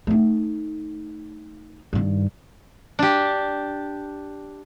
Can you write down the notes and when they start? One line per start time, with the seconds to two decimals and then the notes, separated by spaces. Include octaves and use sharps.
0.07 A3 D#4
1.93 G2 D#3
2.99 D4 G4